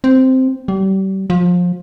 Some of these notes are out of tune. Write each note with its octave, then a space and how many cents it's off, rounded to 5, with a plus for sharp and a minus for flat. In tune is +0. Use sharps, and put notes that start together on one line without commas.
C4 -5
G3 -35
F3 +25